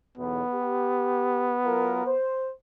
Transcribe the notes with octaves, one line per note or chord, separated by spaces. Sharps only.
B1 E2 B3
G4
F#3 F4 A#4
C5